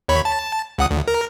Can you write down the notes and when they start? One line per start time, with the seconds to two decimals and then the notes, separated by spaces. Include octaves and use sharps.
0.08 D#2 C#5 B5
0.25 A5
0.78 C#2 F#5 D#6
0.91 D2
1.08 A#4